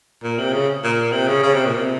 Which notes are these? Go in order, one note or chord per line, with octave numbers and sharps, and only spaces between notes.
A#2
C3
C#3
A#2
C3
C#3
C#3
C3
A#2
C3